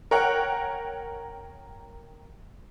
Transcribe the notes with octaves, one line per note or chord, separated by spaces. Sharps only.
A#4 C#5 F#5 G5